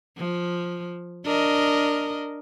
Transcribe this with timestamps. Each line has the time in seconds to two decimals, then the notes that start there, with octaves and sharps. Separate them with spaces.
0.17 F3
1.25 D4 A#4 D#5